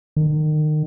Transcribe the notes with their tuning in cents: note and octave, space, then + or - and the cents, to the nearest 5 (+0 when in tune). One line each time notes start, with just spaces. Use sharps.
D#3 -30